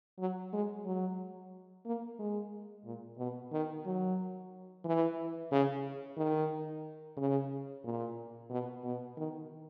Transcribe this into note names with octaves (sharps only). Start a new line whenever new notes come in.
F#3
G#3
F#3
A#3
G#3
A#2
B2
D#3
F#3
E3
C#3
D#3
C#3
A#2
B2
B2
D#3